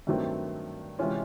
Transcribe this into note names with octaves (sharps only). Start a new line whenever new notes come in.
G2 D#3 F#3 A3 C4
C3 E3 G#3 C#4 F4